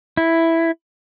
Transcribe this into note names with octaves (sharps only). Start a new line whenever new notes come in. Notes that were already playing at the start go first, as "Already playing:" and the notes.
E4